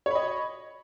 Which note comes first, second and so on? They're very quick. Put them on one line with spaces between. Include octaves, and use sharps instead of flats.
C#5 B5 D#5